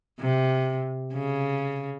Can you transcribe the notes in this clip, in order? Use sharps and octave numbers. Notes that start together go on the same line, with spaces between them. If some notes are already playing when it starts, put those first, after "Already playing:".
C3
C#3